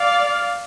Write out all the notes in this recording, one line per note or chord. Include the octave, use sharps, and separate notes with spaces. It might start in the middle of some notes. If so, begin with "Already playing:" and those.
Already playing: D5 F5